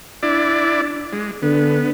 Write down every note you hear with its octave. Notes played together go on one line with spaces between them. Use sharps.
D4 E4 D5
G#3
D3 B3